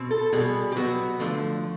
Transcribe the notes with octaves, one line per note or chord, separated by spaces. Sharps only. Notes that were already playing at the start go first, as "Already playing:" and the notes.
Already playing: B2 C4
A4
B2 G3 B3 G#4
G4
B2 F#3 B3 F#4
D3 F3 A3